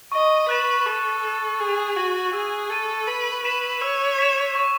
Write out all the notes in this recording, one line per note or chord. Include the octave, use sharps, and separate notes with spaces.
D#5 C#6
B4 F#6 A6 E7
A4 C#6
F#6 A6 E7
G#4 E6
F#4 G#6 D#7
G#4 E6
A4 G#6 D#7
B4 E6
B4 B6 E7
C#5 E6
B6 E7
C#6